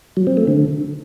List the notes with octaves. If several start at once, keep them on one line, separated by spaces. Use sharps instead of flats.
F#3
C4
A3
D3